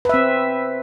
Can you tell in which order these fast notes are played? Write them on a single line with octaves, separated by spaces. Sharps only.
B4 E5 C4